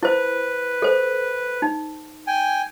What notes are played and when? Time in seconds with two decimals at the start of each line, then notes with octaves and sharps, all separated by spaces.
0.03 E4 B4 C5
0.82 A4 C5
1.62 D#4
2.27 G5 G#5